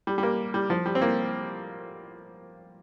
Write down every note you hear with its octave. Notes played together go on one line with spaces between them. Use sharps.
G3
G3
A#3
G3
F3
G3
C4
A#3